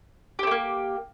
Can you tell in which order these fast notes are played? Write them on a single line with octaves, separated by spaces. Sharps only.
G4 C4 A3 A#3